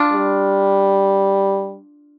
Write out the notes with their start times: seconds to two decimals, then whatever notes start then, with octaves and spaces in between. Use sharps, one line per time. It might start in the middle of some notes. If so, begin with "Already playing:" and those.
Already playing: D4 F4
0.13 G3